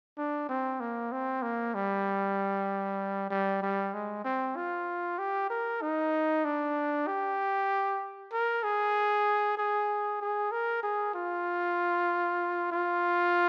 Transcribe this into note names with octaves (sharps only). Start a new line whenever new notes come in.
D4
C4
A#3
C4
A#3
G3
G3
G3
G#3
C4
F4
G4
A#4
D#4
D4
G4
A#4
G#4
G#4
G#4
A#4
G#4
F4
F4